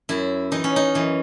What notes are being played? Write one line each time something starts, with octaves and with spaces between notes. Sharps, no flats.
F#2 E4
E3 D#4
C#4
D#4
F#2 E3